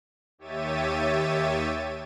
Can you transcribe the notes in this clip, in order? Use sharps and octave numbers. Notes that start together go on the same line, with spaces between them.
D#2 G4 C#5 E5 A6 D#7